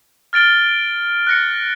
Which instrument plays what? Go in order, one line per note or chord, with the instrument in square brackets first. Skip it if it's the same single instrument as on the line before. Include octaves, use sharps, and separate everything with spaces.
[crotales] F6 A6 D7 G7
F#6 A#6 C#7